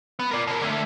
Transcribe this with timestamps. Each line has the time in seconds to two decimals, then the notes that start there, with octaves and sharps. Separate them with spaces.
0.19 B3
0.31 A#4 D5
0.47 B2 A#4
0.61 D3 A3